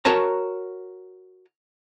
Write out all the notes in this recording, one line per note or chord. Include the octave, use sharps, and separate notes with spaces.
F#4 A#4 C#5 A5 A#5